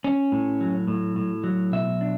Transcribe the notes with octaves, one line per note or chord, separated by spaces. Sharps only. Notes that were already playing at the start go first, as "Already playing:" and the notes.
C#4
A2
F#3
A2
A2
F#3
B2 E5
D4